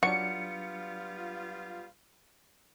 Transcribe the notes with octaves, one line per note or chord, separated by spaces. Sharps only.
F#3 G3 B3 D4 F4 F#4 C#7